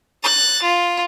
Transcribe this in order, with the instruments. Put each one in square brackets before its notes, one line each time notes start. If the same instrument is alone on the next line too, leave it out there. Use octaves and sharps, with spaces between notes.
[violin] F#6 A6
F4